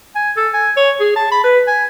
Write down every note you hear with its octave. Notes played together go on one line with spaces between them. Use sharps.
G#5
A4
G#5
C#5
G#4
A5
B5
B4
G#5